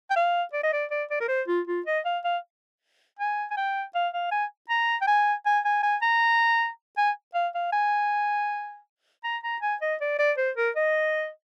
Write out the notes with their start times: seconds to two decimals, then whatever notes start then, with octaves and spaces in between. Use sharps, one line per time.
0.11 G5
0.16 F5
0.53 D5
0.63 D#5
0.73 D5
0.91 D5
1.10 D5
1.21 A#4
1.29 C5
1.48 F4
1.68 F4
1.86 D#5
2.05 F5
2.24 F5
3.19 G#5
3.51 G#5
3.57 G5
3.95 F5
4.14 F5
4.32 G#5
4.70 A#5
5.02 G5
5.07 G#5
5.46 G#5
5.65 G#5
5.83 G#5
6.02 A#5
6.97 G#5
7.35 F5
7.55 F5
7.73 G#5
9.24 A#5
9.44 A#5
9.62 G#5
9.82 D#5
10.01 D5
10.19 D5
10.38 C5
10.57 A#4
10.76 D#5